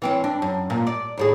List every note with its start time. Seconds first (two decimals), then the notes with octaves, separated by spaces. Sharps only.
0.02 E3 C4 C#4
0.24 D4
0.42 F#2
0.70 A#2
0.87 D5
1.17 D#2 A2 G#4